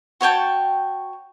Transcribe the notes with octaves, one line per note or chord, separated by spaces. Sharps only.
F#4 C#5 G5 A5